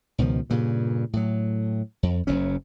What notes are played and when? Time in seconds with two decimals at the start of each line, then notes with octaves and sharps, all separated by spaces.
0.18 C#2 B2 D#3 F3
0.50 G2 A#2 C#3
1.13 A2 F#3
2.03 F2
2.27 F#1 F#2 F#3 C#4